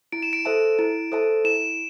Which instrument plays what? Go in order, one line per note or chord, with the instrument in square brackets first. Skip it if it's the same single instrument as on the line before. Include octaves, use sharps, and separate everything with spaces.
[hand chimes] E4 [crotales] D7
[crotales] E7
D7
[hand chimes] A4 C5 E5 A5
E4
A4 C5 E5 A5
[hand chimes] E4 [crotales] E7